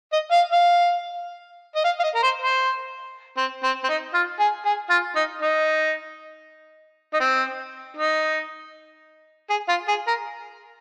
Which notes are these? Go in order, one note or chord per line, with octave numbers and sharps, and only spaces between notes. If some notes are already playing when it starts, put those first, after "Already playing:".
D#5
F5
F5
D#5
F5
F5
D#5
A#4
C5
C5
C4
C4
C4
D#4
F4
G#4
G#4
F4
D#4
D#4
D#4
C4
D#4
G#4
F4
G#4
A#4